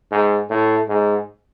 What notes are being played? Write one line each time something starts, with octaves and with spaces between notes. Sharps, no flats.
G#2
A2
G#2